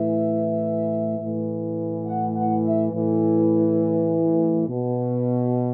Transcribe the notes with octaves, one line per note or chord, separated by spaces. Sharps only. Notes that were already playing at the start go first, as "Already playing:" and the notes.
Already playing: A2 E3 E5
A2 E3
F#5
F#5
E5
A2 E3
B2